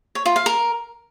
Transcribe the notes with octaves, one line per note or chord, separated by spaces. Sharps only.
C#5
F4
F5
A#4